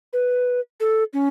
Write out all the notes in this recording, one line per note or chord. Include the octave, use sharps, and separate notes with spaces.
B4
A4
C#4